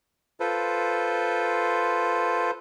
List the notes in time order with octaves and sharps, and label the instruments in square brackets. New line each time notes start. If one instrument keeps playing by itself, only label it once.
[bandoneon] F4 A4 B4 C5